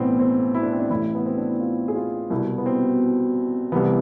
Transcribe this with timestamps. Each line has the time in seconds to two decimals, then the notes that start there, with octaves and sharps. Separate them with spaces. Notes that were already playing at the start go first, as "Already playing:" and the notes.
Already playing: B1 A2 E3 B3 C4 D4
0.19 C4
0.54 E4
0.63 D4
0.72 C4
0.80 D4
0.90 A1 A2 E3 E4
1.15 B3
1.26 C4
1.38 D4
1.49 E4
1.60 F4
1.88 G#4
1.96 F4
2.30 C2 B2 E4
2.58 B3
2.66 C4
3.72 C2 C3 E3 B3